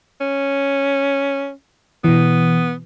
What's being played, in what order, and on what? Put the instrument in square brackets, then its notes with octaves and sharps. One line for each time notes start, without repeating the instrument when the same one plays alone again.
[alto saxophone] C#4
[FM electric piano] B2 E3 [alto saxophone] B3